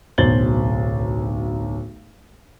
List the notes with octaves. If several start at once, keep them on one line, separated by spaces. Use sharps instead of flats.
D1 B1 C5 A6 F#7 G7